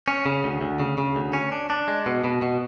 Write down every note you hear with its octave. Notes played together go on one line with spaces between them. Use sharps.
C#4
C#3
D2
D2
C#3
C#3
D2
C#4
D4
D4
G#3
B2
B2
B2